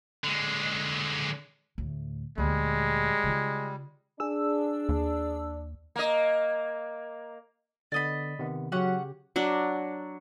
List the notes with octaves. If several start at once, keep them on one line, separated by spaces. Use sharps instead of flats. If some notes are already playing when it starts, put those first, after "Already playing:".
D3 G#3
D2 A2
D2 A#2 G3 G#3
C#3 F4
D4 G#4 E6
D#2
A#3 D#5
D3 B3 D5 D#5 B5
C3 D#3 B3
C#3 F#3 C#4 G4 F#5
F#3 D4